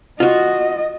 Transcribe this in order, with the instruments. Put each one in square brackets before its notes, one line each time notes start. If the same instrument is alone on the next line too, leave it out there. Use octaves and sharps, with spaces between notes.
[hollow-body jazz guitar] F4 F#4 [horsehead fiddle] D#5